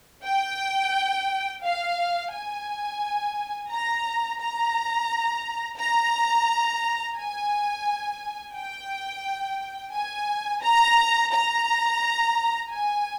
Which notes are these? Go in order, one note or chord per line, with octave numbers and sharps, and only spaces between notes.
G5
F5
G#5
A#5
A#5
A#5
G#5
G5
G#5
A#5
A#5
G#5